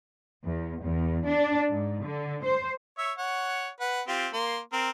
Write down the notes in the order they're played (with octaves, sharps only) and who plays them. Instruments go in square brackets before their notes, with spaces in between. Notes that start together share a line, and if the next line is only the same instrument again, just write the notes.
[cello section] E2
E2
D4
G#2
D3
C5
[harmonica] C#5 E5
C#5 F#5
B4 F#5
C4 F4 G4
A#3 C6
C4 A#4